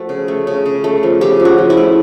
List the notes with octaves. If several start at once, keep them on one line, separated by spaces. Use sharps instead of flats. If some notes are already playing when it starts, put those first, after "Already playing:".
Already playing: F3 A3 F#4
C#3
A3
C#3
C#3
A3
F3
C#3 G4
F3
F#4
F3
E4
A3